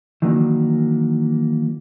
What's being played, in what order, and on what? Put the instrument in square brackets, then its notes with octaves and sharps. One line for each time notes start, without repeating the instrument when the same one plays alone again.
[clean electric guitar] D#3 E3 F#3 A#3 D4